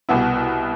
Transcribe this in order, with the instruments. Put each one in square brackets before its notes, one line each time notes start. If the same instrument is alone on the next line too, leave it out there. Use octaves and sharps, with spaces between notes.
[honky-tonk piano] C2 B2 B3 E4